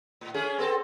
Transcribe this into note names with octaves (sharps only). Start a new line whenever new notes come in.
A2
A3 C#4 G#4
B3 C4 A4